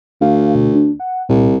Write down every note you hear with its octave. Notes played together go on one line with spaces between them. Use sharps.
D2 F5
B2
D4
F#5
C2 A#2